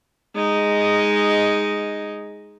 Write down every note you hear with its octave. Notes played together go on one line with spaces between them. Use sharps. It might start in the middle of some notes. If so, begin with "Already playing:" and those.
G#3 D#4